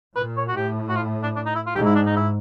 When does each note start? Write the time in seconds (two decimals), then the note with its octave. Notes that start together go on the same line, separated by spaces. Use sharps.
0.16 A#2 B4
0.37 C#5
0.48 F#4
0.56 A2 G4
0.89 F#4
0.96 F4
1.23 D4
1.36 D4
1.46 D#4
1.55 E4
1.66 F4
1.75 G#2 G4
1.86 E4
1.95 D4
2.06 D#4
2.16 E4